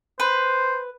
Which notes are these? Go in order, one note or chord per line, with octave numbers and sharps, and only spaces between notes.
B4 C5